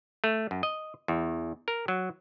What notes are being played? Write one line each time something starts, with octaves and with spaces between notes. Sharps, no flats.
A3
F#2
D#5
E2
A#4
F#3